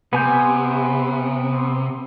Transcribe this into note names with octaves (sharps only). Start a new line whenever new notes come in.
C3 B3 G#5 G6